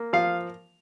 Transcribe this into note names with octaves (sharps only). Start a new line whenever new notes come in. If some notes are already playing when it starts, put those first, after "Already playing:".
Already playing: A#3
F3 F5